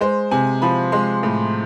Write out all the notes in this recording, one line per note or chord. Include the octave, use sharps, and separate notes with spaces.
G#3 C5
C3 G#5
F3 B5
G#3 C6
A2